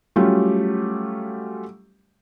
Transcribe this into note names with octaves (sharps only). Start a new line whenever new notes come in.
F#3 G3 A3 C#4 F4 G4